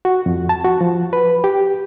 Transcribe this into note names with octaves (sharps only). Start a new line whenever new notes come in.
F#4
F2
A5
F#4
F3
B4
G4